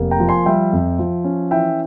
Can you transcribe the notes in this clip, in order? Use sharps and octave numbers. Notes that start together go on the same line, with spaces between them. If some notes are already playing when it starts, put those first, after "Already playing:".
Already playing: F1 A#3
G5 A#5
F3
G#5 C6
G3 E5 G5
F2
F3
C#4
E3 E5 G5